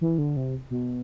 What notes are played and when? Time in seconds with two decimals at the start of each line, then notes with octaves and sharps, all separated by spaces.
0.01 E3
0.18 D3
0.36 C3
0.70 B2